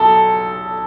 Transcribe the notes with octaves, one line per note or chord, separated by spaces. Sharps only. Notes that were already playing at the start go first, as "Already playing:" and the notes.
Already playing: B1 A4